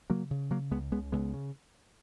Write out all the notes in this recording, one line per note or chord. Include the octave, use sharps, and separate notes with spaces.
C#3 F#3 A#3
C#3
C#3 F#3 A#3
C#2 G#3 B3
C#2 G#3 B3
C#2 G#3 B3
C#3